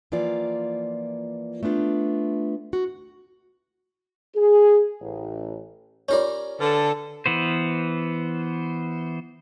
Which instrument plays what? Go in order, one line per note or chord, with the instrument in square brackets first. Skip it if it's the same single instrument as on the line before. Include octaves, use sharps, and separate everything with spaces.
[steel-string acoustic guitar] E3 F3 A#3 F4 D5
A3 B3 D4 F4
F#4
[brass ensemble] G#4
A1
[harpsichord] C#4 A#4 D5 [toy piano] F4 G4 C#5
[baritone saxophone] D3 [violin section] A4 [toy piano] B4
[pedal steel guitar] E3 B3 C5